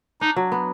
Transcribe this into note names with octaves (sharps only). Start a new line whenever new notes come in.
D4 D#4
F#3
B3